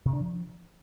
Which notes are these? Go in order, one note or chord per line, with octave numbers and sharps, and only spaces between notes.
C3
D4
F3